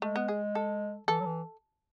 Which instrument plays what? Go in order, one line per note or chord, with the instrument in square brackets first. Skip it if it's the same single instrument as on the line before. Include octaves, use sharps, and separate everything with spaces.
[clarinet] G#3 [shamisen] A3
[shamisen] B3
G#4
A4
[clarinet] E3 [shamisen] A4
[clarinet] F#3
E3